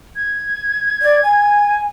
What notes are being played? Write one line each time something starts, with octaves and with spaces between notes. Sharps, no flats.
G#6
D5
G#5